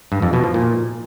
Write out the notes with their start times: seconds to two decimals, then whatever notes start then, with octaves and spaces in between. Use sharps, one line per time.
0.12 G2
0.22 F2
0.33 B2
0.44 F3
0.54 A#2